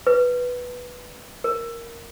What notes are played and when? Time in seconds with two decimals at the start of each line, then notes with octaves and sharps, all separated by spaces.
0.07 B4
1.44 A#4